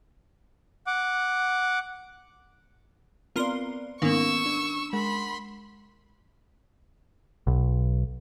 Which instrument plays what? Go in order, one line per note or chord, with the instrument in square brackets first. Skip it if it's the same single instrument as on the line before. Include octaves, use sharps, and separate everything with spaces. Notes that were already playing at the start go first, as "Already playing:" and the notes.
[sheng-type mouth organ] F#5 D6
[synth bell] B3 C4 D5 [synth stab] F4 A#4 C6
[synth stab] G#2 D#3 A#3 [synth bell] B3 C#4 [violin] C#6 E6
[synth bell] D4
[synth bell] G#3 A#4 F#5 [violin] B5 C6
[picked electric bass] B1